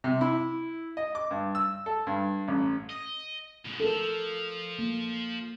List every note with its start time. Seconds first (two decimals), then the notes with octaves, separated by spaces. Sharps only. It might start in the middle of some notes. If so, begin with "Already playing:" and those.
0.04 C3
0.21 E4
0.97 D#5
1.15 D6
1.31 G2
1.55 E6
1.86 A4
2.07 G2
2.48 A1
2.90 D#5
3.65 G#2 B2
3.80 F3 A4 A#4
4.79 A#3